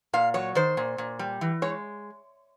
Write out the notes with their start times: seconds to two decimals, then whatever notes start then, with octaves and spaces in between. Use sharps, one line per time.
0.13 A#2 F5
0.34 F#3 C#5
0.55 D#3 C5
0.77 A#2
0.98 A#2
1.19 G3
1.41 E3
1.62 G#3 C#5